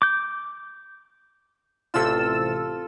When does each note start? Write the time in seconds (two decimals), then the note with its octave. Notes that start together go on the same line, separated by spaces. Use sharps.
0.02 D6 G6
1.94 A1 C3 F4 A4 E6